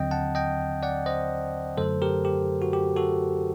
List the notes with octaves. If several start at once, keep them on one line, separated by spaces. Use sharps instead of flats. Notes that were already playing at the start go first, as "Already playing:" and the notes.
Already playing: D#2 D3 F#3 C4 D#5 G5
F#5 A5
D#5 G5
D5 F#5
C5 D#5
F#2 D3 F#3 A3 A4 C5
G4 A#4
G4
F#4
G4
F#4 A4